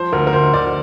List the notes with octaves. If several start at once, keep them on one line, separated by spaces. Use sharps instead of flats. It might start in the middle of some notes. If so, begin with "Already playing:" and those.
Already playing: F3 C5
D2 A#4
A#4
D2 C5
D2 D5